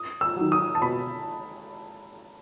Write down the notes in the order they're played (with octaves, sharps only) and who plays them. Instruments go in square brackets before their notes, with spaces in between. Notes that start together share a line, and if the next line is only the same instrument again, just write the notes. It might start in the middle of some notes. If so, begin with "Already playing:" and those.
Already playing: [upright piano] D#6
E6
[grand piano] D#3 F#3
[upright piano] D#6
A5
[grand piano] B2 [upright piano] B5